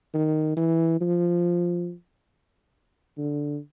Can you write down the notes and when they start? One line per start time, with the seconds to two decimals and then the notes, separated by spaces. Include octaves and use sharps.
0.14 D#3
0.57 E3
1.01 F3
3.18 D3